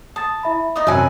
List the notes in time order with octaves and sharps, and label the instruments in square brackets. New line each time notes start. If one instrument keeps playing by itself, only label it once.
[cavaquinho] A5 [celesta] D#6 A6
[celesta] E4 E5 B5
[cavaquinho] D#4 D5 D#6
[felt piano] F#2 [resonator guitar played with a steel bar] C3 G#5 [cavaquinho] B4 E5 [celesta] C#5 D5